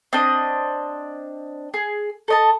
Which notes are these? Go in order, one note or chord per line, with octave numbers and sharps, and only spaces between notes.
C4 D4 D#5
G#4
A4 D#5 A5